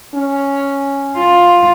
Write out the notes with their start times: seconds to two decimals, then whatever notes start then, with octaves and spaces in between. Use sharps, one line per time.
0.15 C#4
1.18 F4